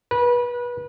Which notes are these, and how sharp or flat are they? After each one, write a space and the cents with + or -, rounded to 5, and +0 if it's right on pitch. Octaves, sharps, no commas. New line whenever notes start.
B4 -25